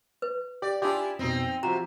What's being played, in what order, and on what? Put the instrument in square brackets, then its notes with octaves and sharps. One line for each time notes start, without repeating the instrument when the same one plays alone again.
[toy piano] B4
[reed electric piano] G4 [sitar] D5
[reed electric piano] D4 G4 [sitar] E4 F4 G#4
[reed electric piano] F2 B2 [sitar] C4 D#4
[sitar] C3 [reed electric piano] F3 F4 F#4 [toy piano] A#5